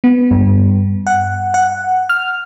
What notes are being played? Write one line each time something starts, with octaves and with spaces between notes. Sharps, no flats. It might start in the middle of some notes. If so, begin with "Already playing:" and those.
B3
G2
F#5
F#5
F6